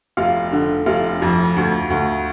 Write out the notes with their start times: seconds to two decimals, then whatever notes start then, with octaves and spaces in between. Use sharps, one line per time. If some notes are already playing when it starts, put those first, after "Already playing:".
0.17 F1 F4 F5
0.53 D3
0.86 F1 F4 F5
1.22 F2
1.56 D2
1.90 D2